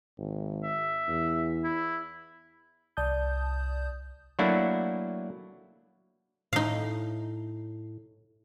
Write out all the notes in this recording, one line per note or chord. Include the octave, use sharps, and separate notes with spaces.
G#1
E5
E2
E4
C2 D5 A5 D#6 G6
F#3 A3 A#3 D4 E4 F#4
A2 D#4 F5